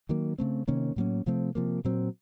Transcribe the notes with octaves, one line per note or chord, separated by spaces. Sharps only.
D#3 F#3 A#3
C#3 A3 C4
C3 D#3 A#3 C#4
A2 F#3 A#3 C#4
C3 F3 A3 C4
C3 F3 A#3
A#2 F#3 C4